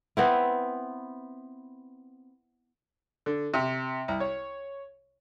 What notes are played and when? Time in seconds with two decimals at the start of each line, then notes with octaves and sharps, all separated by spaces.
0.17 B3 C4 E4
3.26 D3
3.54 C3
4.08 C2
4.20 C#5